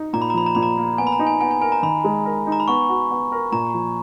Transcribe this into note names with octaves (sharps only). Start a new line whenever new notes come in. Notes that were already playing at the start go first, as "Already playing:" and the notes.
Already playing: D#4
A#2 A#5
B5
A#5
F3 B5
A#5
A#2 B5
A#5
A#3
B3 G#5
B5
A#5
D#4
G#5
B3 G#5
G#5
A#4 G#5
A#5
D#3 B5
G#3
A#4
D#4
A#5
B5
B3 C#6
F#4
B3
A#4
A#2 A#5
F3